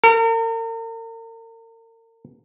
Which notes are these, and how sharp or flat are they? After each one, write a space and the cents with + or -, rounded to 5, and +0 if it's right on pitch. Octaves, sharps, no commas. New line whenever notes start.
A#4 -40